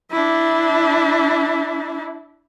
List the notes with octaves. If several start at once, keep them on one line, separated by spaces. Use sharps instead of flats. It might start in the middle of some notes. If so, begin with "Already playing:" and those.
D4 E4